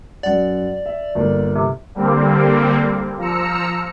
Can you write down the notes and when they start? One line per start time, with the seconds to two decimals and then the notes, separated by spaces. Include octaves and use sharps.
0.23 F#2 D5 F#5
0.86 E5
1.15 G1 A#3
1.56 C3
1.95 D3 G3 A#3 C4
3.18 F3 A#5 E6 C#7